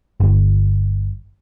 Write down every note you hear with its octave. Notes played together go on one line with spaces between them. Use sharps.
G1